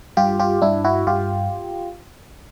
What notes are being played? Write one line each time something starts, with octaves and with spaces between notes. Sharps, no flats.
G2 F4 G4
F4 G4
G2 D4 E4
E4 F#4
G2 F4 G4